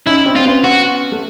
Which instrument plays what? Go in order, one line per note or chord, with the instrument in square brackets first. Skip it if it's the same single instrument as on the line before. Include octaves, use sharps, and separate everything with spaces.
[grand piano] C#4 D#4 [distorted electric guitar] E4
[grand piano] C4 D4
[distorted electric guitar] F4
[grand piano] C4
B3 C#4
[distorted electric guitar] F#4
[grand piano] A3